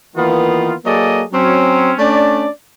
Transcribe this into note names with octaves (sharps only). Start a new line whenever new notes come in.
D#3 E3 A#3 B3 F4
F#3 A#3 G#4 A4 D5 D#5
F#3 C4 C#4
A3 C#4 D4 D5